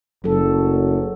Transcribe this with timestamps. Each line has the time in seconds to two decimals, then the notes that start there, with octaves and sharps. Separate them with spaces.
0.24 F#1 F#3 A4